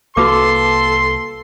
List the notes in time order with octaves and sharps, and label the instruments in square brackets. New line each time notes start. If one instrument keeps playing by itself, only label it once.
[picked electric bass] C2 A#3 [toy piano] F#4 B4 D6 [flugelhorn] A4 [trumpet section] C6